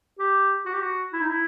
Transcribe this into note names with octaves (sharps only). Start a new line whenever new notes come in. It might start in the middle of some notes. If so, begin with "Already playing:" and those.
G4
F#4
G4
F#4
E4
D#4
E4